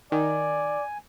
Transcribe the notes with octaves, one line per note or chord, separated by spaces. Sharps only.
D#3 D5 G#5